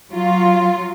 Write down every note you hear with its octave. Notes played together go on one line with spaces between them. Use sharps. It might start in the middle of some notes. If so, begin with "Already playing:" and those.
F#3 F4